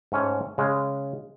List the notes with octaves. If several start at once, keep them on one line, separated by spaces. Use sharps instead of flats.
G#2 A3 C#4
C#3 G#3